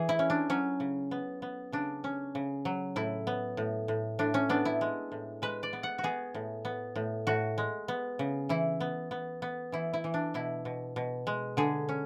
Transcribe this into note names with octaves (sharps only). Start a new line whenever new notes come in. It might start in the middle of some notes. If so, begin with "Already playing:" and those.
Already playing: E3 G#4
E4
C#4
D4
F#3 C#4
C#3
B3
B3
C#3 D4
C#4
C#3
F#3
A2 E4
B3
A2
A2
A2 D4
C#4
B3 D4
E4
G#3
A2
G#3 B4
D5
B3
F#5
F#4
B3 G#4
A2
B3
A2
A2 F#4
G#3
B3
C#3
E3 E4
B3
B3
B3
E3 E4
E4
E3
D4
B2 E4
B2
B2
G#3
D3 G#4
C#4